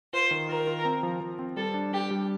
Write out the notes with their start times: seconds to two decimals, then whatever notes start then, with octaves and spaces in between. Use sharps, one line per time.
0.13 F4 C5
0.31 D#3
0.49 F4 A#4
0.67 F4
0.85 C4
1.03 F3
1.21 F3
1.39 C4
1.57 G3 A4
1.74 D4
1.92 D4 G4
2.11 G3